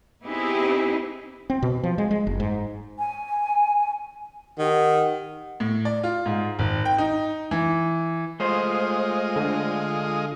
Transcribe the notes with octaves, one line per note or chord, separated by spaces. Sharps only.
B3 C4 D#4 E4 G4 G#4
C4
B2
F3
G#3
G#3
F#1
G#2
G#5
D#3 G4 F#5
A2
D5
F4
G#2
G#1
G5
D#4
E3
G#3 A3 F4 C5 D#5
D3